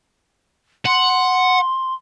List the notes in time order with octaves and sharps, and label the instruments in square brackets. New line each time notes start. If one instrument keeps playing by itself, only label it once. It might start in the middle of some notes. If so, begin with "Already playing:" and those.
[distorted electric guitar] F#5 [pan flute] C6